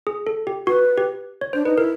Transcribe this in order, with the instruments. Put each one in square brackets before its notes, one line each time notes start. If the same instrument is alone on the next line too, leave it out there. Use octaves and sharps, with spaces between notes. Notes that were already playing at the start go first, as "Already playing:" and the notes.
[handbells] G#4
A4
G4
[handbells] F#4 [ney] B4
[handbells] G4
C#5
[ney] D4 [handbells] C5
[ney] D#4 [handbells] B4
[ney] E4 [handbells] A#4